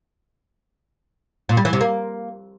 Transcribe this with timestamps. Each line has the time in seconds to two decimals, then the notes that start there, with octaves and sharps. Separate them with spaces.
1.49 A#2
1.57 G3
1.65 E3
1.73 C3
1.81 A#3